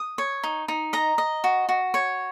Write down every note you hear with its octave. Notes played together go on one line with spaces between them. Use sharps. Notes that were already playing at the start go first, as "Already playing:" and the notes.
Already playing: D#6
C#5
D#4
D#4
D#5 A#5
D#5
F#4
F#4
C#5